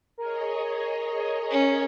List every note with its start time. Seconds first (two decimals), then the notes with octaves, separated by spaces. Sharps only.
0.18 G#4 A#4 C#5 D#5
1.51 C#4